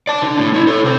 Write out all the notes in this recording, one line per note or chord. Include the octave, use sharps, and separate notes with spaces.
D5 A5
D3 D4
A2
C#4 E4
A4 C#5
C3 C5